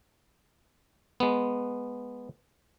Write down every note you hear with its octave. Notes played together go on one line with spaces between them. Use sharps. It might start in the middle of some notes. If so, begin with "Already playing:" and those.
G#3 B3